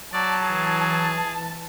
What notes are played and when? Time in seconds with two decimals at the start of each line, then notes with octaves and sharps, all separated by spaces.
0.13 F#3 D5 A5
0.44 E3 G#4